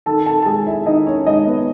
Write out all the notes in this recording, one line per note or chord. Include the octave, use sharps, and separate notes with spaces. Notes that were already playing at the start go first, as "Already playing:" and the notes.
D#3 A4 A5
A4 A5
A5
G#3 G#4 G#5
E4 E5
D#3 D#4 D#5
C#4 C#5
G#3 D#4 D#5
B3 B4